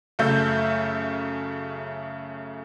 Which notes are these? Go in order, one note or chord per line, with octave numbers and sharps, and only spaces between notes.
F#2 C#3 A3 E5 G6